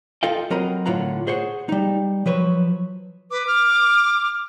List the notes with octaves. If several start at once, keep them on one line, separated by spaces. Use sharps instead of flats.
F4 A4 D#5 F5 G5
F#3 C4 A#4 D#5 A#5 B5
A2 D3 E4 F4 F#5 A#5
G#4 C5 C#5 F#5
G3 D#4
F3 F#3 B4 C#5
B4 D6
F6